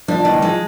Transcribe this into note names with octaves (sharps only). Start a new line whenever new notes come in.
F3 D4
D#3 E3
E3
F3 G#3